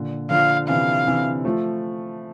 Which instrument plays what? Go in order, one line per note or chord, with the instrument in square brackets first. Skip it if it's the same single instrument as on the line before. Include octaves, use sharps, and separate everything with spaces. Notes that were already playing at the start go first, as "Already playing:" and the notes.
Already playing: [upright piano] A#2 D3
[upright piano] D3 F3 [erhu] F5
[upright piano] C3 E3 [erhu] F5
[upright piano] C3 E3
F3 A3